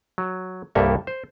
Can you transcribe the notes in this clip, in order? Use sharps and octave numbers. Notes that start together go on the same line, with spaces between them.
F#3
C2 G2 A#3 G4 A4 E5
C5